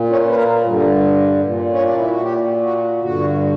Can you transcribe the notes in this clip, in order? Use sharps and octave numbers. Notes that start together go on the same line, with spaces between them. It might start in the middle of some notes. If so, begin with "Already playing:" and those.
Already playing: A#2
C#4
B4
A#4
G2 D3
A#2
C#4
D4
E4
F#4
A#2 G4
F#4
G2 D3 F#4